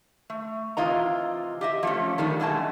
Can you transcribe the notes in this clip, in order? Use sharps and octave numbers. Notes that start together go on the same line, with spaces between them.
A3
C3 E3 F4 D#5 A#5
G4 D#5 E5
F3 A3 C#4
D#3 G3 A3 D4
F#2 B2 G#3 A3 A5